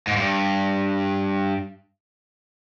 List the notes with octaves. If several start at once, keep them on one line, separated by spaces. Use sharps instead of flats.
G#2
G2